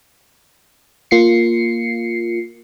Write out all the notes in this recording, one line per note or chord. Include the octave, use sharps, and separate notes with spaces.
A#3 F4 C7 C#7